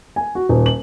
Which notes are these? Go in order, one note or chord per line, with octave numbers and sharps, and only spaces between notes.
G#5
F#4
D#1
F#7